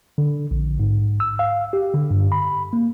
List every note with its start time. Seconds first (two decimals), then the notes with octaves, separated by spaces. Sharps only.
0.18 D3
0.51 A#1
0.80 G#2
1.20 E6
1.39 F5
1.73 G4
1.94 D3
2.11 G2
2.32 B5
2.73 A#3